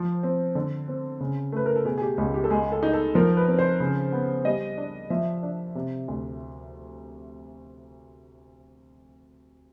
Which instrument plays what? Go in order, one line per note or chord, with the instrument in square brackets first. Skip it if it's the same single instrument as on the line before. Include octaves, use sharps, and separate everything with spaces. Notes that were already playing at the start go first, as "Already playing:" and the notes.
Already playing: [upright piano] F3 C5
C4
D3
C4
C#3
A3 B4
A#4
A4
B2 G#4
G#4
G4
C#2
G4
A4
G#3 G#4
A4
D#4
A4
F3 A#4
B4
C4
C5
C#3
B3
G3 D#5
D4
F3 E5
D4
C3
D2